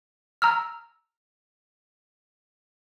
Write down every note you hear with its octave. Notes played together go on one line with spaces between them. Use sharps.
A#5 E6 F6